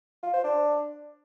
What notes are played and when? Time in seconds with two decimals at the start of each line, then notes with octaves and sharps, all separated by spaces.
0.23 F4
0.34 C5
0.44 D4